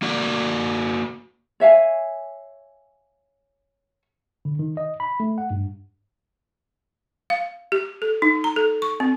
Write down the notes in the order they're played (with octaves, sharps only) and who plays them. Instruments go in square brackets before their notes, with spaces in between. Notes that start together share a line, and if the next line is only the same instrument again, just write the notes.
[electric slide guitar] A#3 F#4 D5
[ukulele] C#5 E5 F5 G#5
[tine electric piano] D3
D#3
D#5
B5
A3
F#5
G2
[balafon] F5
G4
A4
D#4
A#5
A4
C#6
C4